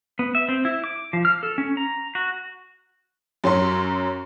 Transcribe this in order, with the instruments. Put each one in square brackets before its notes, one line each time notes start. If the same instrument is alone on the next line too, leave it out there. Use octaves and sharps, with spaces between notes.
[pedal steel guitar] B3
E5
C4
E4
D6
F3
F6
A4
C#4
A#5
F#4
[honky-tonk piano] F#2 F#3 C#4 C6